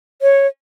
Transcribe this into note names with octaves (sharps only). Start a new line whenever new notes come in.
C#5